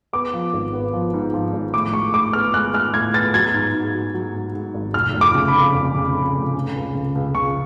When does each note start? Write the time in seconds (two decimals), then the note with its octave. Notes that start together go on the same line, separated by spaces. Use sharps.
0.13 B3 D6
0.33 F3
0.53 G#1
0.73 B3
0.94 F3
1.13 G#2
1.34 F3
1.53 G#1
1.74 A2 D6
1.93 G#3 C#6
2.14 A2 D6
2.33 B3 F6
2.54 G#3 F#6
2.73 G#3 F6
2.94 A2 G#6
3.14 B3 A6
3.34 F#3 G#6
3.54 G#2
3.74 G#2
3.94 F#3
4.14 F#3
4.34 G#2
4.55 G#2
4.74 G#1
4.94 F1 F6
5.14 F1
5.21 D6
5.34 C#3
5.48 B5
5.54 F2
5.75 F2
5.95 C#3
6.15 F2
6.35 F1
6.55 C#4
6.75 C#2
6.95 C#3
7.15 C#2
7.35 C#3 C#6